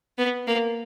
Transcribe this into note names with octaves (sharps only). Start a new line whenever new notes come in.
B3
A#3